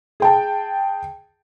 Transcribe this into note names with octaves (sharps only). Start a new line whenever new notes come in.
G#4 G5 A5